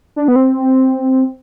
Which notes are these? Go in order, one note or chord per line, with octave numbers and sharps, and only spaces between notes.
D4
B3
C4